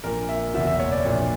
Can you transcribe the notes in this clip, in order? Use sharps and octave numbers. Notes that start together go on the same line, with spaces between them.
A#1 A#2 A#4
E5
F#1 E2 B2 E5
E5
C#5
D5
A#1 A#2